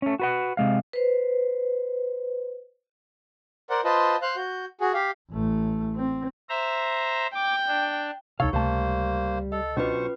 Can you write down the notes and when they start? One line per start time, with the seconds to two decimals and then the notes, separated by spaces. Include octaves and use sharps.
0.02 A3 C#4
0.20 F#4 B4 F#5
0.57 C3 G#3 F5
0.93 B4 C5
3.70 A#4 C5 D5 F#5
3.84 F4 B4 C5 D#5 A5
4.22 C5 F5 F6 F#6
4.36 F#4 G6
4.81 F#4 G#4
4.94 G4 F5
5.31 A1 A3
5.96 C4
6.49 C5 E5 A#5
7.34 G5 D6
7.68 D4
8.40 C#2 C3 D#4 A4 C#5 F5 C#6
8.53 C#2 C3 G3 A3 A#3 C5 A5
9.52 A4 D#5
9.77 B1 C#4 D4 F4 F#4 B4 C5 C#6